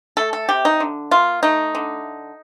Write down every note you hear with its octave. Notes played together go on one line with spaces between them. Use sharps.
A3 A4
A4
C3 G4
D#4
D3
A#3 F4
A3 D#4
D3